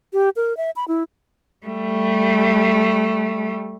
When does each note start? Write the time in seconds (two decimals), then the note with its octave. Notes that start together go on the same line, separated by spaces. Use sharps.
0.13 G4
0.36 A#4
0.57 E5
0.76 B5
0.88 E4
1.67 G3 A3